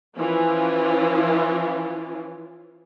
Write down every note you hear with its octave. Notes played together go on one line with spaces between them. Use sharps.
E3 F3 C#4 E4 F4